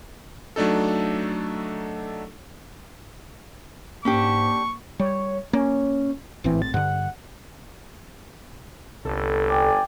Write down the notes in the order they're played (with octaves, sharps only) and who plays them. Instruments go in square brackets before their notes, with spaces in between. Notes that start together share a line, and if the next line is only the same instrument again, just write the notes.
[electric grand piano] F#3 A3 D4 D#4 A4
[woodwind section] G#2 [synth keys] A#3 [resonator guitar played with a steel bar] C#4 D4 G4 [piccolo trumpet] C#6
[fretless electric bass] G3 [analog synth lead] C#5
[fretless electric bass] A#3 [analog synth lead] C#4
[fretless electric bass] G#1 A2 C4 [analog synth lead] E3
[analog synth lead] A6
[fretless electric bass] G2 D3 [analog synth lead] F#5
[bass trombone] G1 [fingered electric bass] C2 [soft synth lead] A4
[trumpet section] D5 G5 G#5